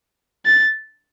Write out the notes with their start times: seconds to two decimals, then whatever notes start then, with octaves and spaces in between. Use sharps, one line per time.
0.46 A6